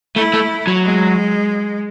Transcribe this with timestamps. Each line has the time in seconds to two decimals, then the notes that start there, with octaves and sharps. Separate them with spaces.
0.15 A3 E4
0.34 A3
0.67 F#3
0.83 G#3